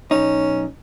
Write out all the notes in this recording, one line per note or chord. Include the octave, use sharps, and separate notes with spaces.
B1 C#4 D#4